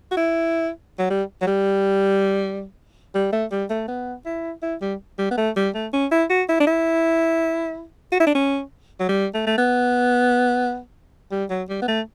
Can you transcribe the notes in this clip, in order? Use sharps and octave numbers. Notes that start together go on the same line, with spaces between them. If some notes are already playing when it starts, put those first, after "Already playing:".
F#4
E4
F#3
G3
F#3
G3
G3
A3
G3
A3
B3
E4
E4
G3
G3
B3
A3
G3
A3
C#4
E4
F#4
E4
D4
E4
F#4
E4
D4
C#4
F#3
G3
A3
A3
B3
G3
F#3
G3
B3
A3